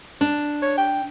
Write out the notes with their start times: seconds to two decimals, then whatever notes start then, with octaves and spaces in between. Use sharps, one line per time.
0.21 D4
0.62 C#5
0.78 G5